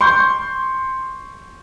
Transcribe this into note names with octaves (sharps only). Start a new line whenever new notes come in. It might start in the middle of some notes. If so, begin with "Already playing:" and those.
C6 C#6 G6